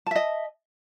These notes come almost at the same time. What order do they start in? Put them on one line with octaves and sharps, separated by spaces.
A5 E5 D#5